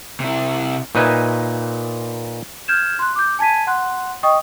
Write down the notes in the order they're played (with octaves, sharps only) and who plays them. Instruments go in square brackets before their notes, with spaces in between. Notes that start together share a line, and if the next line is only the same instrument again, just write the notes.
[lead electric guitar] C3 E4
[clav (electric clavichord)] A#2 D#4 B4 D#5 E5 G#5
[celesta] F6 G6 G#6 E7
C6 F#6
D6 G6
G#5 A5 G#6 B6 D#7
F#5 C6 F#6
D#5 G5 C#6 D#6